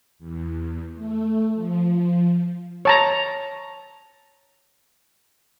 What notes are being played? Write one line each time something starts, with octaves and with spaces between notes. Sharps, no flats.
E2
A3
F3
C#5 A5 A#5